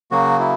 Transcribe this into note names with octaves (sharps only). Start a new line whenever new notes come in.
C#3 F#3 A#3 F#4
E4